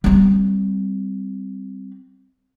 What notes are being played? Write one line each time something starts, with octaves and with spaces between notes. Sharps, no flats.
G3 C4